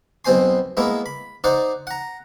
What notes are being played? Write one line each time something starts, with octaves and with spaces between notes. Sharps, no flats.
B1 B2 C4 C5 G#5 C6
G#3 A#3 B3 E4
B5
D#4 C5 D5 F#5
F#5 A#5